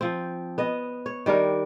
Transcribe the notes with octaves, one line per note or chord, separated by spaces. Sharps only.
F3 C4
B3 D#5
C#5
D#3 G3 D4 A#4